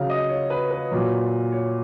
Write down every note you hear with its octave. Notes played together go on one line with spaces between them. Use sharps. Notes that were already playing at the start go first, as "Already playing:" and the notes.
Already playing: C#3 F#3 F5
D#5
C#5
B4
B4
A#2 F#3
C#5